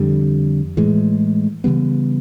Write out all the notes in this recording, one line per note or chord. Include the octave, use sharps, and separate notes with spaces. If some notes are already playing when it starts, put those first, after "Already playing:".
Already playing: F2 D3 G3
A2 E3 G#3
C#3 E3 G3 B3